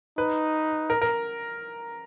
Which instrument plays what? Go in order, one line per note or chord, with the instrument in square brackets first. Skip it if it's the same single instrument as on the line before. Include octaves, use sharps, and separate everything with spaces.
[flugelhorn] D#4 [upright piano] B4
[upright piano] A#4
A#4